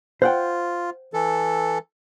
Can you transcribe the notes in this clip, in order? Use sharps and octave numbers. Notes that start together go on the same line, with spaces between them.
F4 C5 F#5 G5
E3 A4